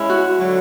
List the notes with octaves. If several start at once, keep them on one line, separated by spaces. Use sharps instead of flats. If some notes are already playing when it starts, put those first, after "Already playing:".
Already playing: G#3 C#4 E4
F#4
D3 F#3